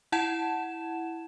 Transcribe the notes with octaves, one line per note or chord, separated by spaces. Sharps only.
E4 F#5 A5 G#6 E7